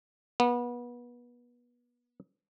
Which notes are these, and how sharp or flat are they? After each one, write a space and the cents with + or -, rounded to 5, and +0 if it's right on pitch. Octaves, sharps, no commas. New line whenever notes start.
B3 -30